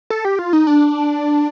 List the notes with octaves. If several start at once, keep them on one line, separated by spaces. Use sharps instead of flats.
A4
G4
F4
D#4
D4